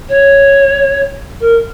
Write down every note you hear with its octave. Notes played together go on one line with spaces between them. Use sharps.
C#5
A#4